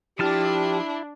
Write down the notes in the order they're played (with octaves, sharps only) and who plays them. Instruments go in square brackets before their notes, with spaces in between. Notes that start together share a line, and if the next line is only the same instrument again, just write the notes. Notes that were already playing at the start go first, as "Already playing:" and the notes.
[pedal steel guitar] F3 A5 F6 [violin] D4 [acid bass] E4 [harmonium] G4